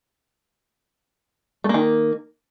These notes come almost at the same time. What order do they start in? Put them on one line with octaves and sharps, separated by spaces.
A3 A#3 D#3